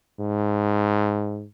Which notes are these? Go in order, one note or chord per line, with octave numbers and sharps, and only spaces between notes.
G#2